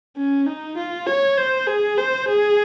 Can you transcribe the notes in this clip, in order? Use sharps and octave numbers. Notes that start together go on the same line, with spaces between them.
C#4
D#4
F4
C#5
C5
G#4
C5
G#4